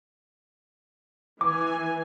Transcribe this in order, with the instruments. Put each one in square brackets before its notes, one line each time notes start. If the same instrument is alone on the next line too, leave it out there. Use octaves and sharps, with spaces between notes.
[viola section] E3 G#5 [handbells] D6